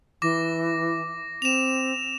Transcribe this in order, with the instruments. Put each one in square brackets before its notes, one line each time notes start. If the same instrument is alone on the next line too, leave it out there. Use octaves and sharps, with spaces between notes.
[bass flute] E3 [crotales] D6 A#6
[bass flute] C4 [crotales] E7 F7